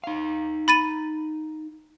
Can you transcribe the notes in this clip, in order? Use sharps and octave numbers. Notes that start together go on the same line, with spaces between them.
D#4 F5
B5 A6 D#7